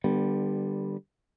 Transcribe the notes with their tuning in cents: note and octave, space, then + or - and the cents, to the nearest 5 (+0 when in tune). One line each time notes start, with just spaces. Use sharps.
D3 +15 G3 +0 B3 -15